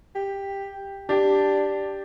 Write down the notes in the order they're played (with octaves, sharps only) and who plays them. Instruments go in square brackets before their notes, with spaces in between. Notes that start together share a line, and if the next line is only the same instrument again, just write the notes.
[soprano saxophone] G4
[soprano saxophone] D4 [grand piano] G4